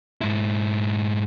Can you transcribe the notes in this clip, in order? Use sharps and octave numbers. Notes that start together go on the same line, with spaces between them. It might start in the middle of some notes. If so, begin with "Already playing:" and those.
G#2 E4